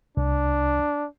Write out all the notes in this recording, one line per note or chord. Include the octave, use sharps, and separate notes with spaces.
C2 D4